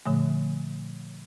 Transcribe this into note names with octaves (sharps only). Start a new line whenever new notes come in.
A#2 D3 F3 A3